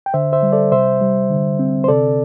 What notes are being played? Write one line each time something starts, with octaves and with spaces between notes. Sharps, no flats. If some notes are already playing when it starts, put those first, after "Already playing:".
G5
D3 C5 E5
C5 E5
G3
A4 D5
C3 C5 E5
G3
D3
C4
C5
C3 A4 D5